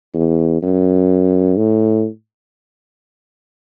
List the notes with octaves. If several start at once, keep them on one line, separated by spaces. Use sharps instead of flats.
E2
F#2
A2